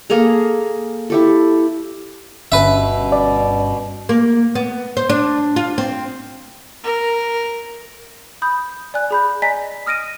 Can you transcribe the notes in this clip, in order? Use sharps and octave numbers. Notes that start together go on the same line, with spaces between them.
A#3 G#4 A4 A#5
E4 G4 A4
G1 G2 B2 C#4 B4 E5
D5
A#3
B3
C5
D4
F4
C4
A#4
B5 D#6 G6
D5 G#5 F#6
G#4 B5 G6
D5 D#5 G#5 A#5 B6
D#6 F6 A#6 D7 D#7